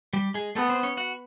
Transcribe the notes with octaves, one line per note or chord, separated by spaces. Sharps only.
G3 G4
G#3 G#4
A3 B3 A4
C4 C5
C#4 C#5
F#4 F#5